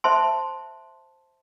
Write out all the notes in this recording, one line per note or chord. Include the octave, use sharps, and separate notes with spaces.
C5 E5 A5 C6